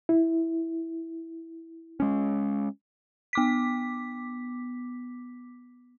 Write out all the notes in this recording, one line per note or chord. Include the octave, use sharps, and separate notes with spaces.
E4
G#3 C#4
B3 D6 B6